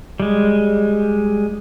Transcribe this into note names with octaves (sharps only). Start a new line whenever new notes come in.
G3 G#3